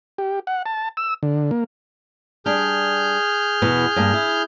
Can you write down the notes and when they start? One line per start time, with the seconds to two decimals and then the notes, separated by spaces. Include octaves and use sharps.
0.18 G4
0.47 F#5
0.66 A5
0.97 E6
1.23 D3
1.51 A#3
2.46 G3 D4 G#4 F6 G6
3.62 E2 B2 B3
3.96 G2 A#3
4.14 E4